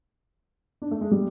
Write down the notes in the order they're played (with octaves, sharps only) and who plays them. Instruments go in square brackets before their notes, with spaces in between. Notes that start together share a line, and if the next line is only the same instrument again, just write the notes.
[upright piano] D4
A3
G#3
G3